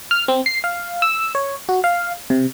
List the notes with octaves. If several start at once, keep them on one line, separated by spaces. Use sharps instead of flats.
F6
C4
C7
F5
E6
C#5
F#4
F5
C3